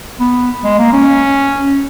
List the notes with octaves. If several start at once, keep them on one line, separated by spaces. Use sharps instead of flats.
B3
G#3
A#3
C#4